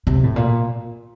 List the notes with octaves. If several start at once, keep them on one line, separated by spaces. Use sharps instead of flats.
C3
A2
A#2